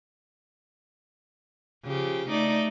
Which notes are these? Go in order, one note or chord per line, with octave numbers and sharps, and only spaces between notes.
C#3 F3 G4
A3 D#4 D5